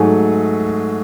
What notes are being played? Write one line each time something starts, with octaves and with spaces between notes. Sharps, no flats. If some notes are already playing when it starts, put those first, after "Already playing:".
Already playing: G#2 F#3 A3 G#4